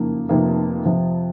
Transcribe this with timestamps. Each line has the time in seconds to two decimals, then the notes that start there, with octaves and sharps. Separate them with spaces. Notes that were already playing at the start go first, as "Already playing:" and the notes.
Already playing: F#1 F2 D#3 A#3
0.29 F1 F2 C3 D#3 A#3
0.86 F2 C3 F3